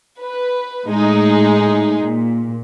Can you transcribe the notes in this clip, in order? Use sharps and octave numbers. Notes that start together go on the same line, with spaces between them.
B4
A2 G#3 D#4 G#4
A#2